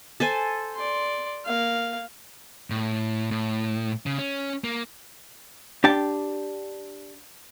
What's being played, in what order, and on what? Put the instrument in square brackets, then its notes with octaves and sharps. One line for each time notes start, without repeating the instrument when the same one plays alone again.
[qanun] A4 C5 G#5
[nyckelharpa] D5 C6
A#3 F5
[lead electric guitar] A2
A2
C#3
C#4
A#3
[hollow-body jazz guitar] D4 G4 G5 A5